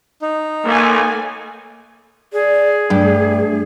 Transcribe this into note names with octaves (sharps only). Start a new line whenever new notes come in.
D#4
B1 A#3 A4 G#5
G#4 D5
G2 A3